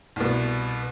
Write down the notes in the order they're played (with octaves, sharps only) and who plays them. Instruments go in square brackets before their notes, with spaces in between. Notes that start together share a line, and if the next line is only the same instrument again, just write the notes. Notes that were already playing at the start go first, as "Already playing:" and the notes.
[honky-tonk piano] C2 B2